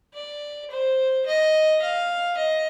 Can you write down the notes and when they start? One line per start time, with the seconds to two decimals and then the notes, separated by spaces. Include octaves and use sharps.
0.14 D5
0.70 C5
1.26 D#5
1.81 F5
2.37 D#5